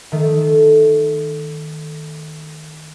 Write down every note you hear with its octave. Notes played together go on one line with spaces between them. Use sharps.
D#3 A3